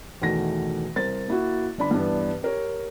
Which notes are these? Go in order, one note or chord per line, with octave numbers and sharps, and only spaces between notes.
E2 B2 D#3 A3 A#6
C2 A#4 C5 A6
A#3 E4 F#4
G1 D4 B5
G2 E3 B3 D4
G4 A#4 C#5